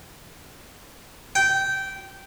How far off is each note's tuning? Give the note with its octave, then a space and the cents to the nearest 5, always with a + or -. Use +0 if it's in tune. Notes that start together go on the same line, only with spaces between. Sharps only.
G5 -15